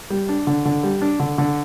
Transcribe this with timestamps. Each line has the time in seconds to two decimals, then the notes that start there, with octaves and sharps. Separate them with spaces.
0.10 G3
0.29 D4
0.47 D3
0.65 D3
0.83 G3
1.02 D4
1.20 D3
1.38 D3